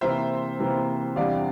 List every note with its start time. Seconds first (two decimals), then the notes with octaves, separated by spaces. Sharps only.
0.01 C3 E3 A#3 C5 E5
0.59 C3 E3 A#3
1.16 E2 C3 G3 D4 D5 F5